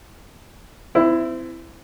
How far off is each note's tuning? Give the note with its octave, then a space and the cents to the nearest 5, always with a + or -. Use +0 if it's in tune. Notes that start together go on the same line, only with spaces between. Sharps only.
C4 -25 E4 +10